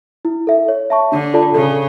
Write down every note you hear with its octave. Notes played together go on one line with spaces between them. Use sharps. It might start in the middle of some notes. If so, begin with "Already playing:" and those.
E4
A4 E5
C#5
E5 A5 C#6
D3 D4
F4 A4 D5 A5
C#3 A4